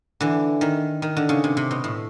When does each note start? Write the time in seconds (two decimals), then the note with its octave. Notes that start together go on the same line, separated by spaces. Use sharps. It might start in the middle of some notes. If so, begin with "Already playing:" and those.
0.21 D3 E3
0.61 D#3
1.02 D#3
1.17 D3
1.29 C#3
1.44 C3
1.57 C3
1.71 B2
1.84 A2